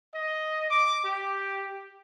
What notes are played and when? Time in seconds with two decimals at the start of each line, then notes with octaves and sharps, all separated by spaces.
0.14 D#5
0.70 D6
1.04 G4